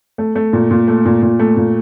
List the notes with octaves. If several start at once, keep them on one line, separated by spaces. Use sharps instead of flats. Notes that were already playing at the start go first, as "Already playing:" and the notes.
A3
A3
A#2
A#2
A3
A#2
A#2
A3
A#2